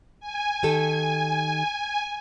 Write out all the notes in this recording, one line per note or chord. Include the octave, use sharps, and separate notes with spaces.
G#5
D#3 G4 A4